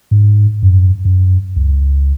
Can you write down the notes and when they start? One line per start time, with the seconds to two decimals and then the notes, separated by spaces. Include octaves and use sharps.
0.11 G#2
0.62 F#2
1.05 F#2
1.56 C#2